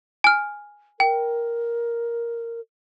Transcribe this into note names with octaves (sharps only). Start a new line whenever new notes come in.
G#5 F6
A#4 G5